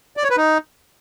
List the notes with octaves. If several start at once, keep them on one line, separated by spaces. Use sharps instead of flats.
D5
C#5
B4
D#4